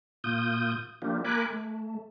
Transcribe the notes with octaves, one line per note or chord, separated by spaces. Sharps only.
A#2 F4 D#6 G6
F3 A#3 D4 F4 G4
A#3 A#4 G#5 B5 D6 F#6
A3